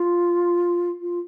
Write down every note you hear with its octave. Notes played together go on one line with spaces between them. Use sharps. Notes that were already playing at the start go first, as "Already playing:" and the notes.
Already playing: F4
F4